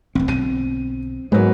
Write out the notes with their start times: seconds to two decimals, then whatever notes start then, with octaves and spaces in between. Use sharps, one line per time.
0.15 D#1 A1 C4
0.29 B1 B2 D3 D#7
1.32 G#2 F#3 G#3 A#3 B3